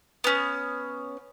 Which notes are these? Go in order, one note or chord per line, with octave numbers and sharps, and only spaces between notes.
B3 C#4